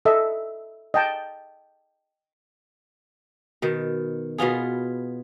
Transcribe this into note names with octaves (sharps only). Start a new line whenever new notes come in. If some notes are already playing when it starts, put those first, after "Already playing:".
A4 D#5 E5
D#5 G5 A5
B2 D#3
B2 B3 F4 G#4